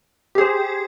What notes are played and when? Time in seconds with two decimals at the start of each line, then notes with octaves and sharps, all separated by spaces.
0.35 G4
0.38 G#4
0.41 C5